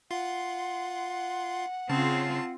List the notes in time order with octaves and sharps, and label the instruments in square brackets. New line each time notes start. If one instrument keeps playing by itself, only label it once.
[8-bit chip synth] F4 C6 [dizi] F#5
[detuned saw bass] C#3 [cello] C4 F4 [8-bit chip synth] A5